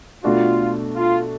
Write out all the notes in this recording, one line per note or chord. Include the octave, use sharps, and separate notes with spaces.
B2 A3 D4 F4 F#4
F4